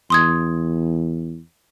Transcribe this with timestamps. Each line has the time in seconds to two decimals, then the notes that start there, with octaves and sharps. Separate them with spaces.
0.10 E2 C6 D#6 G#6